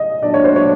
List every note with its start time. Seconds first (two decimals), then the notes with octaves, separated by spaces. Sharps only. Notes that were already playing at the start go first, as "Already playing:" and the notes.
Already playing: D#5
0.23 A#2 F#3 A3 D4 D5
0.34 C#5
0.44 C5
0.56 C#5